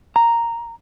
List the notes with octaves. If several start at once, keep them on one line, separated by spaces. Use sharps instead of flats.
A#5